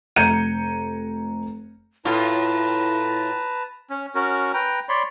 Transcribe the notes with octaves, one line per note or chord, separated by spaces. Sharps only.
F1 A#5 G6 G#6 C#7 D#7
A2 E4 F4 B4 A5 A#5
C#4
C#4 F#4 A#4
B4 G5 A#5
C#5 D5 B5 C6